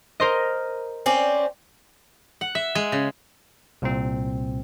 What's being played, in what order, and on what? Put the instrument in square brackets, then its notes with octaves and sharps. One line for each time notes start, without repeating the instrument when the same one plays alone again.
[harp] A#4 C5 D#5
[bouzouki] C4 C#4 D5
[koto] F#5
E5
G#3
C#3
[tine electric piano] C2 A#2 C4